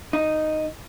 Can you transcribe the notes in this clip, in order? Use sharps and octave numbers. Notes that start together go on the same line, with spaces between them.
D#4